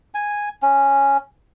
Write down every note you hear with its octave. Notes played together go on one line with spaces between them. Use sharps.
G#5
C#4